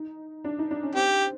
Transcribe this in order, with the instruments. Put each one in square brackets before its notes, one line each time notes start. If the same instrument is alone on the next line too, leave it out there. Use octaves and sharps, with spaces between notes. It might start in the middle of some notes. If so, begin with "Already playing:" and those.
Already playing: [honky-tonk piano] D#4
D4
D#4
D4
C#4
[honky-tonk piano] C4 [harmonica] G4